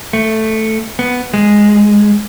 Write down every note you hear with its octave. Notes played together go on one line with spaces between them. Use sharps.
A3
B3
G#3